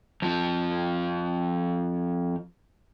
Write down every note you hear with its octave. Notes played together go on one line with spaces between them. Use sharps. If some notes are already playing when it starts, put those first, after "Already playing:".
F2 F3